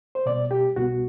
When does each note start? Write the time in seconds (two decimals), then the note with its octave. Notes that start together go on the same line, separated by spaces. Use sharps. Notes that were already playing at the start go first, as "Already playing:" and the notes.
0.15 C5
0.26 B2 G3 B3 D5
0.51 G4
0.76 C2 B2 G3 B3 F#4